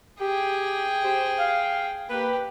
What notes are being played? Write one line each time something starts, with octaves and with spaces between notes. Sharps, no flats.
G4 G#4 G5
G4 C5
F5
A#3 G4 B4